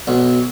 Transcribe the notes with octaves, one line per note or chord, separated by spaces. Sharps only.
B1